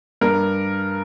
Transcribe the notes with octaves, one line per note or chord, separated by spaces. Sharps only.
G2 A#4